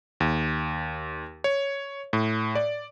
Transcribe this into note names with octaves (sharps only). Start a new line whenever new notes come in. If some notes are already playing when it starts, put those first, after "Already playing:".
D#2
C#5
A2
D5